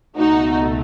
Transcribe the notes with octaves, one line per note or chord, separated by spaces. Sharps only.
C#2 B2 A3 D#4 F#4